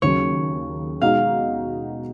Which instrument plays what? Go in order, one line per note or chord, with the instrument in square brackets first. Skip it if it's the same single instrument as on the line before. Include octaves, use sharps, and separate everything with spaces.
[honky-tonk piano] D#2 C#3 F#3 [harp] C#5
[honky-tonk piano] B2 G#3 D#4 F#4 [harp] F5